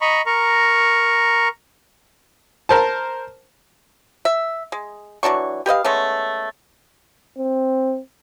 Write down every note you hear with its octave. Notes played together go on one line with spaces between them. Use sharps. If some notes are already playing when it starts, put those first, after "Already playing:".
D#5 A#5 B5 C#6
A#4 A#5 C#6
A#4 C5 A5
E5
G#3
E3 F#3 D4 C#6
G4 B4 D#5 F5
G#3 A3 B3 C#4
C4